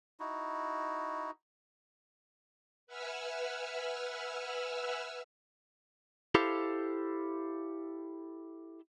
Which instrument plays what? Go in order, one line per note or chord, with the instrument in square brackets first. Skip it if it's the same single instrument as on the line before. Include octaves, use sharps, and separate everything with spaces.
[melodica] D#4 E4 F#4
[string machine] B4 E5 F#5 G#5 E6 F6
[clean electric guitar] E4 G4 A4 C5 F5